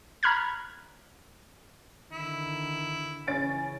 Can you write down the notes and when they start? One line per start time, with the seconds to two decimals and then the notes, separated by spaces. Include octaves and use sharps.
0.23 A#5 B5 F6 F#6 G#6
2.12 D3 D#3 E4
3.27 C#2 C#3 E3 C#4 G#5 A6 D7